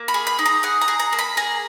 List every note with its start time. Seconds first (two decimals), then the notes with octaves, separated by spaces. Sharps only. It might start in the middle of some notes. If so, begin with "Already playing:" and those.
Already playing: A#3
0.08 B5
0.14 G#4
0.27 B5
0.39 D#4
0.45 A#5
0.63 G#4 F#5
0.81 A#5
0.88 G#4
1.00 A#5
1.13 A#3
1.19 B5
1.37 G#4 A#5